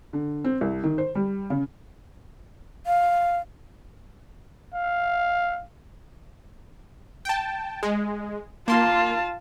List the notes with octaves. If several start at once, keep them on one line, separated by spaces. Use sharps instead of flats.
D3
C4
C2
D#3
C5
G3
C#3
F5
F5
G5 A5
G#3
A#3 F4 A5 C6